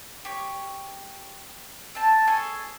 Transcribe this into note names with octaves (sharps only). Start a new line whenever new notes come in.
G4 C#5
C4 A5
G#4 A4 C#5 G#5